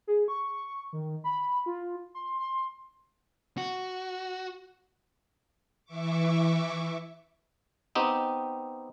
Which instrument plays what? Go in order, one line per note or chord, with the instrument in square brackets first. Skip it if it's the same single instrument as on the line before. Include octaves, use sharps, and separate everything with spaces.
[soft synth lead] G#4
C#6
D#3
B5
F4
C6
C6
[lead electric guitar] F#4
[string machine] E3 E5 C#6 D6
[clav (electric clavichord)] B3 C4 D#4 G4